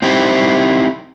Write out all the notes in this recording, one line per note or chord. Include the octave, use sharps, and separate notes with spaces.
C4 D#4 E4 G4 C5